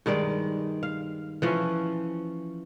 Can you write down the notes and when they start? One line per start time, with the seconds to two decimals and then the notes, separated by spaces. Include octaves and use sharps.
0.06 G2 D#3 G#3 D5
0.83 F5
1.42 E3 F3 C#4